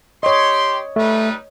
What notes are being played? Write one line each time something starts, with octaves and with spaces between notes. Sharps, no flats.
G4 C#5 D#5 C6
G3 A3 D#4 B4